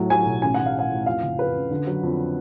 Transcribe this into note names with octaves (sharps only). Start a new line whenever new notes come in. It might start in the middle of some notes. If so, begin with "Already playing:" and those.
Already playing: A2 F#3
F#3 G#5
B1
A1 G#5
A1 F#5
F5
A2
F#5
A2
F2 F5
F#1
F2 B4
C#3
D3
F#3
F2